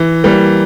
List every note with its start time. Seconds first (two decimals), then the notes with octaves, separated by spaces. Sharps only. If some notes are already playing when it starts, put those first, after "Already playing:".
Already playing: E3
0.24 E3 G3 A#3